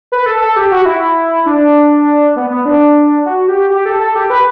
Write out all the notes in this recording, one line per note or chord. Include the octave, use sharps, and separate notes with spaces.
B4
A4
A4
G4
F#4
E4
D4
B3
B3
D4
F#4
G4
G4
A4
A4
G4
B4